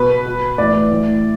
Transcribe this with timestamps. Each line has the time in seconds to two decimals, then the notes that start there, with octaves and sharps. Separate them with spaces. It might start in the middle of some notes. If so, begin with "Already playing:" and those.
Already playing: B2 B4
0.26 B2
0.58 A2 E3 D5
0.90 A2 E3